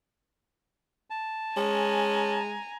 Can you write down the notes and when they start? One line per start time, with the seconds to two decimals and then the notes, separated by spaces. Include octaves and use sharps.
1.10 A5
1.57 G#3 C#4 G#5 A#5